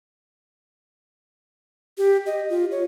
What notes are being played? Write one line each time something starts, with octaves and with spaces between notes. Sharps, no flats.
G4
D#5
F4
C#5